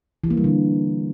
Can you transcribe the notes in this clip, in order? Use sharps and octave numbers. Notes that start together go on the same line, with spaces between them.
E3
A#3
G3
D3